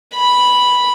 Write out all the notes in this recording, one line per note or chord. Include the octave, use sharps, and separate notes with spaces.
B5